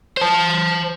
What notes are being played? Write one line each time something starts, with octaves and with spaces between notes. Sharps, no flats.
C5 A5